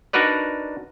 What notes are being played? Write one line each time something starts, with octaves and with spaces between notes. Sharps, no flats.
D4 D#4 F#4 A#4 B4 D5